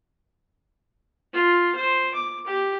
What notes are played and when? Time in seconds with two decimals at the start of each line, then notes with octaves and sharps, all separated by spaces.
1.33 F4
1.75 C5
2.14 D6
2.47 G4